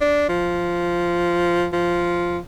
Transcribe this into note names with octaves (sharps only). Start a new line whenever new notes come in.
D4
F3
F3